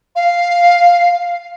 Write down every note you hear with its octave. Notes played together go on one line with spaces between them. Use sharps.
F5